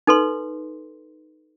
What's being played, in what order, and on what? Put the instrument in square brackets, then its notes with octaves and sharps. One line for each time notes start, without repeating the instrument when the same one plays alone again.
[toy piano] D#4 A4 B4 C6